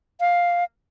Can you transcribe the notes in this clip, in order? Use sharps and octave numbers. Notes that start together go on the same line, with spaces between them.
F5